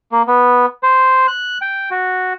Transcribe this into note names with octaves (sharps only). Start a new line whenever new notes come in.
A#3
B3
C5
F#6
G5
F#4